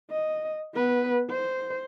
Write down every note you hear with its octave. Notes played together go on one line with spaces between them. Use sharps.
D#5
B3 B4
C5